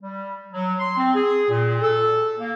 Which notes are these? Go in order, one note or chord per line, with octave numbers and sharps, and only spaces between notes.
G3
F#3
C6
C4
G#4
A#2
A4
A#3